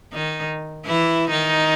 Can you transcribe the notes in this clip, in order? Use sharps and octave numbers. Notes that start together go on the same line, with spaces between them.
D#3 D#4
E3 E4
D#3 D#4